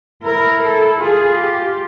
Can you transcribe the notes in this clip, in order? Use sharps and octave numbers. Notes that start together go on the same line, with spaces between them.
E4 A#4
A4
F4 G#4
G4